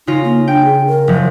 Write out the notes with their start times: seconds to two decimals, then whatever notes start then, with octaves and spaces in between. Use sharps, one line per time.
0.07 C#3 D#4 F4 A#6
0.24 A#3
0.48 D4 G5
0.65 G#4
0.87 A#4
1.08 F#1 F3